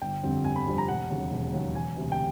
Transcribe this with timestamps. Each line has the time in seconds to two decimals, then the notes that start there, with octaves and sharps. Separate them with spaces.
0.01 G1 G5
0.23 F2 D3 G3 C4
0.44 G1 G#5
0.56 B5
0.67 F2 D3 G3 C4
0.78 A#5
0.88 E1 F#5
1.10 D#2 C#3 F#3
1.32 E1
1.53 D#2 C#3 F#3
1.75 E1 G#5
1.96 D2 C3
2.12 G5